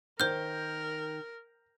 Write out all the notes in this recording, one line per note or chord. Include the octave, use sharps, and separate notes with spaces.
D#3 A#4 C5 F6 G6